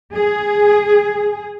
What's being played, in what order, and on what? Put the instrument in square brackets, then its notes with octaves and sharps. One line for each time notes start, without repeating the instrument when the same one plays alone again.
[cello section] G#4